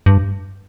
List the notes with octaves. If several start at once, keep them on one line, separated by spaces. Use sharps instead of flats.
G2